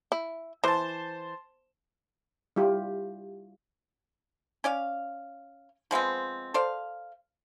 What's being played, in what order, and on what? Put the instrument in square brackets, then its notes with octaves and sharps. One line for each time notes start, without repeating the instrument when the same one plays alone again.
[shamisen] E4
[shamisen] E3 [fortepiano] C5 A5
[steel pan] G3 E4 F4 G4
[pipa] C#4 D5 F5
F3 G#3 B3 C4
A4 C5 D5 F5